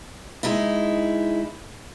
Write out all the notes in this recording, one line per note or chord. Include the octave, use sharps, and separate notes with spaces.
G#3 D#4 E4